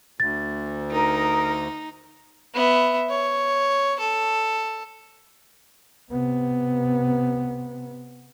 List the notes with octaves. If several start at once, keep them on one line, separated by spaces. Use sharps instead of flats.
D2 A6
D#4 A#4 D#6
B3 E5
C#5
A4
C3 B3